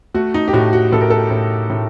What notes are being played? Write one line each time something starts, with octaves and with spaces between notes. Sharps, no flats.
A3 F#4
D#4
G4
A2 F#4
F#4
A2 A4
A#4
A4
A2
A2